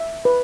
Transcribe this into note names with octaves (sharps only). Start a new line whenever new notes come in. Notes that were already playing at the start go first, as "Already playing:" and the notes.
Already playing: E5
B4